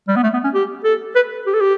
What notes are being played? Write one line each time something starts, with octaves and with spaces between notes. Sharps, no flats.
G3
B3
A3
B3
C#4
G4
A4
B4
G4
A4
G4